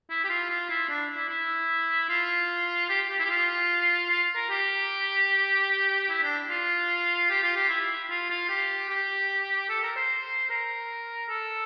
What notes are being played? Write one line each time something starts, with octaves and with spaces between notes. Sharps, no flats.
E4
G4
F4
F4
E4
D4
E4
E4
F4
G4
G4
E4
G4
F4
F4
A#4
G4
E4
D4
F4
G4
F4
G4
E4
F4
F4
G4
G4
A4
A#4
C5
A#4
A4